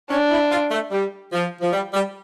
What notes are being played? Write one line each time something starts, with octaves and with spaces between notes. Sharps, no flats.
C#4 D4
E4
F4
A3
G3
F3
F3
G3
G3